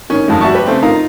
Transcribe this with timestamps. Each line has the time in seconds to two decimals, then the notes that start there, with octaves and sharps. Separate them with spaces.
0.10 D#3 C#4
0.28 F2 D#3 G#3
0.41 G3 F#4 E5 A5 C#6
0.55 G4 B4
0.67 C#3 A3 C4
0.82 D#4 F4 A#4 F5 A#5